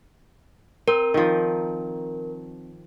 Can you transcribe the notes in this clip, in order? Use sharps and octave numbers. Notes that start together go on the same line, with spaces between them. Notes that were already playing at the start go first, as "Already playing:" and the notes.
C4 A#4
D#3 F3